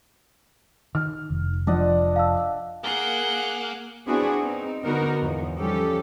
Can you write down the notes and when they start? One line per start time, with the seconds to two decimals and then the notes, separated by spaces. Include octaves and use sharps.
0.95 D#3 F6
1.30 F1
1.67 F3 D4 F4 D#5 F#5
2.16 F5 A5 E6
2.84 A#3 G#4 F#5 G7
4.07 B3 C4 D4 E4 F#4 G#4
4.41 C4 D#4
4.84 D3 B3 D#4 F#4 A#4
5.22 E2 G#2 F3
5.57 D#3 F3 G3 C#4 G4 A4